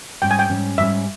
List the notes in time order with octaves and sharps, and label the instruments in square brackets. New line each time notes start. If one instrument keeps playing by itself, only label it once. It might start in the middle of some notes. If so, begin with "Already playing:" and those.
[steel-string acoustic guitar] G#2 G3 C#4 [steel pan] G5
[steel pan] G#5
G5
[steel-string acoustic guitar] G#2 G3 C#4
[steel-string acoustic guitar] G#2 G3 C#4 [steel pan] E5